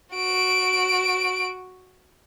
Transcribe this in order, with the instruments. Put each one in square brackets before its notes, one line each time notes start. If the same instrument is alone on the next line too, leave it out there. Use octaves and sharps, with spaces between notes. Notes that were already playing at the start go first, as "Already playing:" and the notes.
[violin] F#4 D7